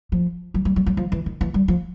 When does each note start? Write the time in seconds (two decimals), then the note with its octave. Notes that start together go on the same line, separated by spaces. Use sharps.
0.12 F3
0.54 F#3
0.65 G3
0.76 F#3
0.86 F#3
0.97 F3
1.12 E3
1.26 D#3
1.41 E3
1.54 G3
1.68 F3